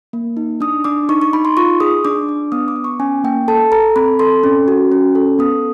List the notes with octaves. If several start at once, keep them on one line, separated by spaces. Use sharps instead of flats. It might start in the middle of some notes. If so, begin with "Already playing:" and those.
A#3
D#4
D4 D#6
D4 D6
D#4 C#6
C#6
D#4 B5
C6
F4 C#6
G#4 D#6
D4 D6
D4
B3 D#6
D6
B3
C#6
C#4 G#5
A#3 G5
A4 A5
A4 A#5
C4 B5
A4 C6
C#4
F#4
C#4
A4
B3 D#6